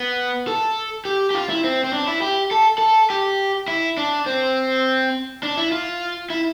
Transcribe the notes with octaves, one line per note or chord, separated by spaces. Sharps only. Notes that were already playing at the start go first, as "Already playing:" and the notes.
Already playing: B3
A4
G4
G4
F4
E4
C4
C4
D4
E4
G4
A4
A4
G4
E4
D4
C4
D4
E4
F4
E4